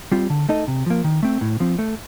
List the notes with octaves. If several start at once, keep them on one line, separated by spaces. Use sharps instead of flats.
G3 C4 F4
D3
A3 D#4 A4 D#5
C3
F3 A#3
D#3
A3 C4
A2
F3 C4
A3